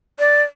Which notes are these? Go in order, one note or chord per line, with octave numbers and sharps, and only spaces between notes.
D5